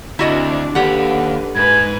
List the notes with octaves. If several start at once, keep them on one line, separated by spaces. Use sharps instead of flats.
D2 C4 D4 E4 F#4 D#5
D#2 D3 G4 B4 F#5
G#2 B4 G#6